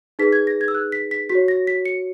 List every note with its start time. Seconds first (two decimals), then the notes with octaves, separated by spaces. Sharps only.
0.19 D#4 G#4 B4 B6
0.33 G#6
0.47 A#6
0.61 G#6
0.68 E6
0.75 F#6
0.92 B6
1.11 B6
1.29 F#4 B6
1.35 C#5
1.48 A#6
1.67 B6
1.85 C#7